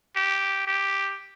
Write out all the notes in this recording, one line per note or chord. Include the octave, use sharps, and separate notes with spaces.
G4
G4